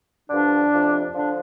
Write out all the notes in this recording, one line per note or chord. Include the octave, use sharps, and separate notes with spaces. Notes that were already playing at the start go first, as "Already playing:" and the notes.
G2 D3 F3 D4
F2 C3 F3
D3 F3 D4